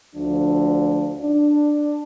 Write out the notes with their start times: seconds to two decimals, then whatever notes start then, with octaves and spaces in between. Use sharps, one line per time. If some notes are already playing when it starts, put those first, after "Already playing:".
0.16 D2 F3 D4
1.21 D4 D5